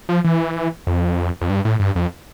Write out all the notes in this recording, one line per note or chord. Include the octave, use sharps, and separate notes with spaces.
F3
E3
F2
F2
G2
A2
G2
F2